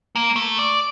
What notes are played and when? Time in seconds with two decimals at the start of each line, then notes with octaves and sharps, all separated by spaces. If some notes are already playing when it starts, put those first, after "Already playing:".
0.15 A#3
0.36 A3
0.59 D5